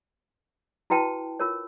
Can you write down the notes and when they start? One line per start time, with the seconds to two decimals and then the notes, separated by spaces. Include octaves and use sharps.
0.90 E4 F#4 B4 G5 A5
1.39 F4 A#4 C#5